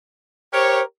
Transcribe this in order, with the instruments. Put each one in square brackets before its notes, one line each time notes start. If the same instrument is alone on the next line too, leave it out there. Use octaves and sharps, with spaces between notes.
[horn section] G4 A#4 C#5 [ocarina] C5